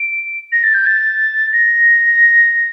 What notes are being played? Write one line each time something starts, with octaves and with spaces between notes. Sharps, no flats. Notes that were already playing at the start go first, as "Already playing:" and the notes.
Already playing: D7
A#6
A6
G6
A6
A#6